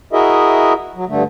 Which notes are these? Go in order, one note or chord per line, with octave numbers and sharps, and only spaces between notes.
E4 F#4 G#4 A#4 D#5 E5
F#3
G2 D3 A3